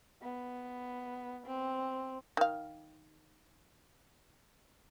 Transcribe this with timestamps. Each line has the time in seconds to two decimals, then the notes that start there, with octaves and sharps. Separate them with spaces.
0.22 B3
1.46 C4
2.37 D#3 F5